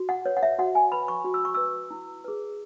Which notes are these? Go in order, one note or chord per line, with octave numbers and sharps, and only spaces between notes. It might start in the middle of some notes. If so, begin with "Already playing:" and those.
Already playing: F#4
F#5
B4 C#5
F#5
E5
F#4 F#5
G#5
B4 B5
C#6
F#4
E6
C#6
B4 E6
E4
G#4 B4